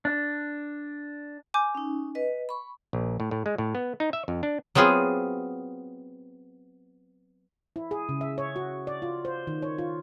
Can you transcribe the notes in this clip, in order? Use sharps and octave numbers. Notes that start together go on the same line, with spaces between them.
D4
G#5 D6 G6
C#4 D#4
B4 D#5
B5 C#6
A#1
A2
A2
G#3
A2
B3
D#4
E5
F2
D4
F#3 B3 C4 F4 G#4
E4
G#4
C#3
E5
C#5
F#4
D5
F4
C5
D#3
C#5
F4